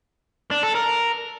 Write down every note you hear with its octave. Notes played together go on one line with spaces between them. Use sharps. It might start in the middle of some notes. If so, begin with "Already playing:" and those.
D4
A4
A#4